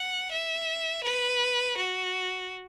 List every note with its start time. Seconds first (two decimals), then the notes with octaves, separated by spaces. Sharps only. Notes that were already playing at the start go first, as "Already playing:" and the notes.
Already playing: F#5
0.31 E5
1.04 B4
1.77 F#4